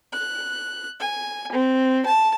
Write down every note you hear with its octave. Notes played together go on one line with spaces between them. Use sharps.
F#6
G#5
C4
A5